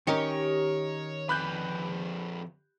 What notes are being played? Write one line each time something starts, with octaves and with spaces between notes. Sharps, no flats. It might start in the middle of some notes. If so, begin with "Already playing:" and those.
D#3 C#4 G4 A#4 C#5 D#5 C#7
F2 B4 B5 F#6 G6